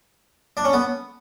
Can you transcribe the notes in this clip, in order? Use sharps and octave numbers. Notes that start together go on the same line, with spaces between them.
D4
C#4
B3